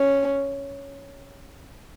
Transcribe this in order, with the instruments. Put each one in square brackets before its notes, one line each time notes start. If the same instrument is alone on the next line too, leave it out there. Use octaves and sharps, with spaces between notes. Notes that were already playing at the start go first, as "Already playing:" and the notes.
Already playing: [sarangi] C#4